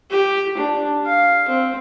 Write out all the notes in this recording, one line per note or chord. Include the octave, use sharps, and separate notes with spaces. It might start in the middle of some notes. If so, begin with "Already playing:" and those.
G4
D4
F5
C4